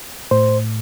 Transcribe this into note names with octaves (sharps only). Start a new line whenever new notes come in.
A2 C5